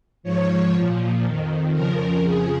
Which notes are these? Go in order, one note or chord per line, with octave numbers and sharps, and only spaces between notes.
G#2 F3 C#5
A#2 F3
F2 D#3
F2 C#3 F3 A#4
F2 C#3 F3 G#4